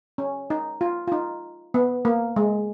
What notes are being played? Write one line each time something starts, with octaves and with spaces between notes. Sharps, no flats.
C#4
D#4
F4
F4
D#4
B3
A#3
G#3